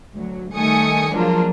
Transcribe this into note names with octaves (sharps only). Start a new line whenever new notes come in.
D2 F#3
D#3 G3 A3 G#5 D#6 C#7
F3 F#3 G#3 A#3 D4 F4